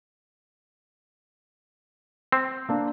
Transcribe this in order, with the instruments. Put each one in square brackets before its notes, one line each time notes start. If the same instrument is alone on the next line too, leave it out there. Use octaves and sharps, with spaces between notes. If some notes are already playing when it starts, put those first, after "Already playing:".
[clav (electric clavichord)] C4
[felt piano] A#3 D4